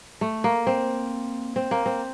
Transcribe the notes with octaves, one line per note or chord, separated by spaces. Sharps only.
A3
A#3
C4
C4
A#3
C4